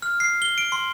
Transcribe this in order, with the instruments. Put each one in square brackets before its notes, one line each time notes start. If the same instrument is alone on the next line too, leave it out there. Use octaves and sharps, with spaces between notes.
[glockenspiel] F6
C7
G7
D7
C6